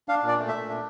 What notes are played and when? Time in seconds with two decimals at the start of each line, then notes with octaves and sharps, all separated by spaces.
0.09 D4 F5
0.23 A#2
0.28 D5
0.38 A3
0.48 E5
0.53 A#2
0.69 D4